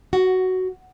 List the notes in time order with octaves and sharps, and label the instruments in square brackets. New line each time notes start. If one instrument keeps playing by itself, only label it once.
[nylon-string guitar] F#4